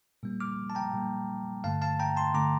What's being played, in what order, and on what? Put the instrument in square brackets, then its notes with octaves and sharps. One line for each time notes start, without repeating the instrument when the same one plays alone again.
[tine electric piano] A#2 G3 A#3
D6 F6
A5
G5 A#5
A#2 G3 A#3
G2 D3 A3 F5 A5
F5 A5
G5 A#5
A5 C6
D3 A3 A#5 D6